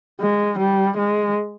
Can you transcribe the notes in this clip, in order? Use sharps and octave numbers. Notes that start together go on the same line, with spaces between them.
G#3
G3
G#3